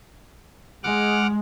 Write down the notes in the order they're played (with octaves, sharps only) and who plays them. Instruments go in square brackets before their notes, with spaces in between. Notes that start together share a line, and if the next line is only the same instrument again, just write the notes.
[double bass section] G#3 [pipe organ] F#5 D6 F6